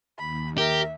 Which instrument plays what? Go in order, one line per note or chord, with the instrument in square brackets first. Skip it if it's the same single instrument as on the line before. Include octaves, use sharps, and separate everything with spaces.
[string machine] D#2 [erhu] B5
[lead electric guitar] G4 [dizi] A#4 [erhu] E5